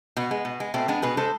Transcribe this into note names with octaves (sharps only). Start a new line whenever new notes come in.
B2 B3
G#3
B2
G#3
B2 A3 C4
G#3 B3 D4
B2 G#4 B4
G#3 A4 C5